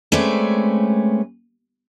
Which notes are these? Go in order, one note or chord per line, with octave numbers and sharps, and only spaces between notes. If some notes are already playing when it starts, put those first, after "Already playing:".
G#3 A3 C4 C#4 B4 D5